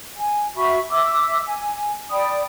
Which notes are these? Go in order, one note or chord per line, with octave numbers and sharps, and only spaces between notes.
G#5
F#4 E5 B5 C#6
E5 D6 E6
G#5
D5 G5 B5 D#6